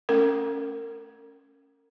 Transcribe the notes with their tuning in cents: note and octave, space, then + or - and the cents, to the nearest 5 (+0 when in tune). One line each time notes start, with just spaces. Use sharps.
A3 +0 C#4 +0 A#4 -30